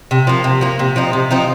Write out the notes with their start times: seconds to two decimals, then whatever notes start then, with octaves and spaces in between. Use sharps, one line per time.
0.11 C3
0.27 F3 A#3
0.44 C3
0.61 F3 A#3
0.79 C3
0.96 F3 C4 D#4
1.13 C3
1.31 F3 C4 D#4